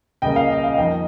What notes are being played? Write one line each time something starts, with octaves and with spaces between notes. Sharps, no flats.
C#2 C#3 G3 A#3 D#5 G5
F5
D#5
F5
F5
F2 D#3 A#3 D#5 G5